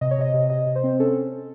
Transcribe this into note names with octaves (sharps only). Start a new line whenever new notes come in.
C3 D#5
C#5
C3 D#5
C3
C3 D#5
C3
C5
C4
C#4 A4